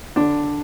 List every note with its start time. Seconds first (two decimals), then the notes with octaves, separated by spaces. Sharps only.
0.16 D3 D4